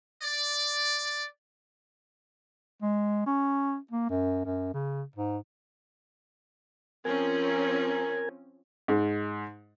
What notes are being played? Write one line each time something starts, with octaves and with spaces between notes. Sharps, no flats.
D5
G#3
C#4
A#3
F#2
F#2
C#3
G#2
F3 C4 C#4 A#4 G#5
G#2